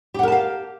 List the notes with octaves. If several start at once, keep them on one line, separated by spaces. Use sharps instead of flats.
G4 A#4 F5 F#5 A5